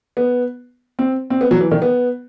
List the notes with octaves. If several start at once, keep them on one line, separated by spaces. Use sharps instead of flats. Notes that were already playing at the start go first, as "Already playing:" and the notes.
B3
C4
C4
B3
F#3
E3
D#3
B3